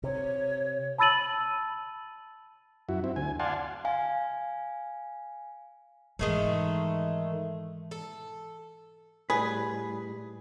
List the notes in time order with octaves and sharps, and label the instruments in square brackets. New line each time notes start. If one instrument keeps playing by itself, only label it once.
[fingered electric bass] C3 [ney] C#5
[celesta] A5 B5 E6 A6 D#7 F#7
[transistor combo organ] F#2 E4 F#4
C4 E4
D2 G#5
D5 F5 F#5 G#5 A5 C6
[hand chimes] F5 G#5
[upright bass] G#2 E3 [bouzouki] D#3 G#3 A3
[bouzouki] A4
[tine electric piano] A2 G3 [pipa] G#4 [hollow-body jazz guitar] B4